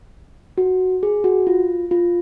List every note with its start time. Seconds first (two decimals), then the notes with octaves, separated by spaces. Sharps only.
0.58 F#4
1.03 G#4
1.24 F#4
1.47 F4
1.91 F4